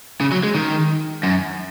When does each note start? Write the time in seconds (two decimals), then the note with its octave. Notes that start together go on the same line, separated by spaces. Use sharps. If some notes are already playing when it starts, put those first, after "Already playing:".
0.21 C#3
0.32 F#3
0.43 G#3
0.55 D#3
1.23 F#2